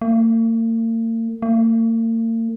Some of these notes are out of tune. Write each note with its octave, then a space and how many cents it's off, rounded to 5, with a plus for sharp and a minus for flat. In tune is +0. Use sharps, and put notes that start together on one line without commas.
A#3 -45
A#3 -45